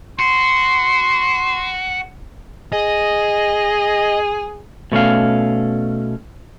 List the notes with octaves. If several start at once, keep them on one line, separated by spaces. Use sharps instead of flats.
F#4 C6
G#4 D#5
B2 A3 C#4 F5